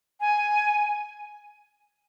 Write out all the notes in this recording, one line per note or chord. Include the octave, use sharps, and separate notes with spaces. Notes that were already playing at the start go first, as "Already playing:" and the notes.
G#5